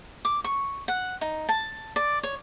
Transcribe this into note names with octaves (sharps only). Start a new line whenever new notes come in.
D6
C#6
F#5
D#4
A5
D5
C#5